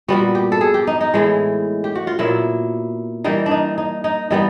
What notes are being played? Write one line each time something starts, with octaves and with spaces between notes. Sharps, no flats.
A#2 G3 B3 F#4
G4
A4
G#4
G4
D#4
D#4
A2 E3 G#3
G4
F#4
F4
A#2 F#3 B3 E4
E3 G3 A#3 D#4
D4
D#4
D#4
D#4
E3 G3 B3 D#4